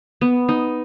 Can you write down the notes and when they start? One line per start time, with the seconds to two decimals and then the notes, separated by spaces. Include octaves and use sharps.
0.21 B3
0.49 D#4